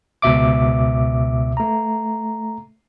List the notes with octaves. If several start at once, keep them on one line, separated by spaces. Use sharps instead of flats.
C#2 B2 E5 D6
A3 A#5